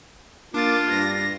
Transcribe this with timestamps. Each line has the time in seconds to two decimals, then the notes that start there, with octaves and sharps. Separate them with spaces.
0.54 A#3 D4 F4 D6 A6
0.89 G2 A#6